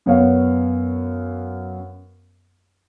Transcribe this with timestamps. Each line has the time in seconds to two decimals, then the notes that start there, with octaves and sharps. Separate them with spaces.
0.06 F#2 B3 C#5 F5